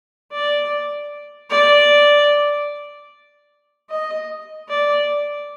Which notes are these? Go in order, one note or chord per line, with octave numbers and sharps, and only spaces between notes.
D5
D5
D#5
D5